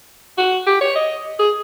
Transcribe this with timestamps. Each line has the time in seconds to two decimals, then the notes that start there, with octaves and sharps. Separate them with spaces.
0.38 F#4
0.67 G4
0.81 C#5
0.96 D#5
1.39 G#4